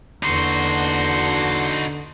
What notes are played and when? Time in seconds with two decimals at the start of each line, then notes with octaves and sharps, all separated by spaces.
0.23 E2 D3 A#3 D#4 F#4 C6